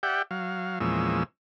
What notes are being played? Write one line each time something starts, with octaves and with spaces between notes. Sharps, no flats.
G4 D5 E5 F#5 G5
F#3 F5
E2 A#2 F3 G#3 C#4 E6